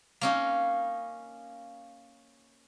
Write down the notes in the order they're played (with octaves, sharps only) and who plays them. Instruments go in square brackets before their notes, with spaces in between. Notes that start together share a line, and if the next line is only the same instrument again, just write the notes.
[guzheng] A#3 C#4 D#4